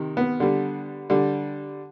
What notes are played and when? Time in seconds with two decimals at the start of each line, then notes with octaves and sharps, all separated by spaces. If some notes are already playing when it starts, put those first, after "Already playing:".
Already playing: C3 D#3
0.17 B3
0.40 D3 G3
1.10 D3 G3